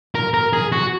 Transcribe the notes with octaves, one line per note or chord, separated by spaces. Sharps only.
A#4
A#4
G#4
F#4